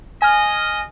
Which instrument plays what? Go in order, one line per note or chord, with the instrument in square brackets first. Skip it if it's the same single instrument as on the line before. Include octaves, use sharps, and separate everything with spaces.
[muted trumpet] D#5 [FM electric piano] G#5 F6